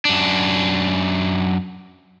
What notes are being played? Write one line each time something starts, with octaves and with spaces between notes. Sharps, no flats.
F#2 D4